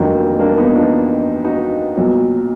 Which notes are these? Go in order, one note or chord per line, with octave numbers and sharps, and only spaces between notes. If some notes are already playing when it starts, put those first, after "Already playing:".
Already playing: F1 F2 D#3 F#3 A#3 D4
A#3 D4
B3 D#4
D4 F4
D#4 F#4
B1 A#2 F#3